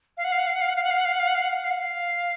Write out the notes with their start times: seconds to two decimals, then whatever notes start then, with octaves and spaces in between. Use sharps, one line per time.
0.17 F5
0.24 F#5
0.32 F5
0.39 F#5
0.46 F5
0.54 F#5
0.61 F5
0.69 F#5
0.76 F5
0.83 F#5
0.91 F5
0.98 F#5
1.05 F5
1.13 F#5
1.19 F5
1.27 F#5
1.35 F5
1.42 F#5
1.49 F5
1.57 F#5
1.64 F5
1.71 F#5
1.79 F5